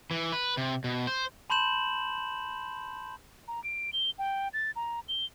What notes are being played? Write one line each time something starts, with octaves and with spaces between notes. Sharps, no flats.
E3
B4
C3
B2
C5
A5 B5 C6 G6 E7 F#7
A#5
D7
G7
G5
A6
A#5
G7